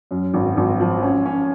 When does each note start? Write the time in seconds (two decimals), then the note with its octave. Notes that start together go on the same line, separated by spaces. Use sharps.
0.11 F#2
0.34 G#1
0.57 G#1
0.80 F3
1.03 C#4
1.26 C#4